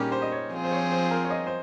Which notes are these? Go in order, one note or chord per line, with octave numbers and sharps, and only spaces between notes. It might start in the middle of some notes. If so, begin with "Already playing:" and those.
Already playing: A#2 G3 C#4 D#4 G4 G#4 A#4
C5
D#5
C#5
F3 C4 F4 G#4
C5
C#5
C5
A#4
C#5
D#5
C5